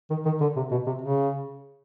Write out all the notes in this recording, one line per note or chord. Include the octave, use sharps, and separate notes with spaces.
D#3
D#3
D3
C3
B2
C3
C#3